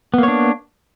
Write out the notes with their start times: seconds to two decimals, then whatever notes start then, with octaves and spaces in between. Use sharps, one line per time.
0.14 B3
0.18 A#3
0.23 C#5
0.28 D4